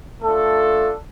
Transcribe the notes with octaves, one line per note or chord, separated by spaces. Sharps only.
A3 D4 F4 A4